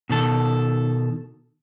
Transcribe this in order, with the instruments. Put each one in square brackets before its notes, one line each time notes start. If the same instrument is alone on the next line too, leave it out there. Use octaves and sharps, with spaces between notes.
[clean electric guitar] B2 D#3 A4